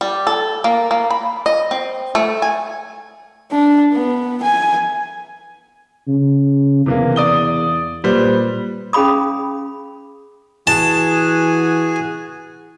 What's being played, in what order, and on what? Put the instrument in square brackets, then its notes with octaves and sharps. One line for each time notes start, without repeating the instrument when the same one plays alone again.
[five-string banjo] G3
A4
A#3
A#3
B5
D#5
C4
A3
G#5
[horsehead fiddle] D4
B3
G#5
[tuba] C#3
[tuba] E2 [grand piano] C3 E3 A#3
[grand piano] D5 D#6 G7
[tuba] A#2 [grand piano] G3 B4 C5
[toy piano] C#4 G#4 F5 B5 D#6
[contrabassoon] E3 [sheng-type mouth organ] F#4 G#4 G#5 [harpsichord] A5